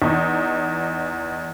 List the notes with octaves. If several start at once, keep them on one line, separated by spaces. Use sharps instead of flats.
E2 D#4